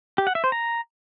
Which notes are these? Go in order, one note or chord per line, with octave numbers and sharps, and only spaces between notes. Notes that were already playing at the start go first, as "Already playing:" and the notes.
G4
F#5
E5
C5
A#5